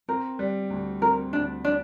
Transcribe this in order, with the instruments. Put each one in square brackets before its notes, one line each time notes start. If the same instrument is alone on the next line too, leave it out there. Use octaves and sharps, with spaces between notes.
[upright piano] C4 [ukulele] A#4
[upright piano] G3
D2
[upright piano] C4 [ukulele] A#4
[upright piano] D2 [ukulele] D4
[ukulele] D4